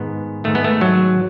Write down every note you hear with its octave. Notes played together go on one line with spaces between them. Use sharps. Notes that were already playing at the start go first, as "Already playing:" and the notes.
Already playing: G#2 D#3 B3
G#2 D#3 A3
B3
A3
F#3